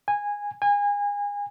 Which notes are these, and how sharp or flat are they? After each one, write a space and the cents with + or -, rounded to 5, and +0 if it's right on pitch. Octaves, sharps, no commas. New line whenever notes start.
G#5 -15
G#5 -30